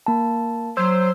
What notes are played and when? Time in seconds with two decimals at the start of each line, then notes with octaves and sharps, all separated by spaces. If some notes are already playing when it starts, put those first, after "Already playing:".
0.06 A#3 A5
0.77 F#3 C5 E6